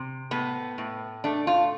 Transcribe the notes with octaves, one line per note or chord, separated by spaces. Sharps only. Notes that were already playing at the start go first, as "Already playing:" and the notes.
Already playing: C3
A2 B3
A2
A3 D4
F4